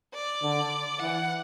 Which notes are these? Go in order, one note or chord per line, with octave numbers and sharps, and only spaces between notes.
D5
D3
E3 F#5